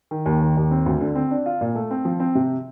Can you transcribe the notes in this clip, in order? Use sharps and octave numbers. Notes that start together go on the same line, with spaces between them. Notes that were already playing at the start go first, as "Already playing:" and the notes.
D#3
D#2
D#3
D#2
C4
D2
D3
C4
D4
F4
A#2
A3
C4
F3
C4
C3